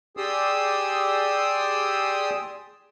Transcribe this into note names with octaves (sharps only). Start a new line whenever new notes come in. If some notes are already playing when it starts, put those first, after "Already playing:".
G4 G#4 D5 C6 D#6 E6